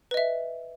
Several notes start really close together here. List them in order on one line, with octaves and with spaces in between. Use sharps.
B4 D#5 E5